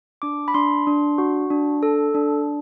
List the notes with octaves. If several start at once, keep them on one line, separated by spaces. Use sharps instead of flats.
D4 D6
B5
D4 C6
D4
F#4
D4
A4
D4